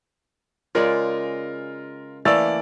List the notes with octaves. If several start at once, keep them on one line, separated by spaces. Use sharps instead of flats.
C#3 G#3 F4 A#4 D5
E3 A3 A#3 D5 E6 A6